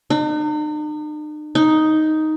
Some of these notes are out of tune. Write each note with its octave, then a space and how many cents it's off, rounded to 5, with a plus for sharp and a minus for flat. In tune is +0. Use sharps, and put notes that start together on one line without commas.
D#4 -45
D#4 +5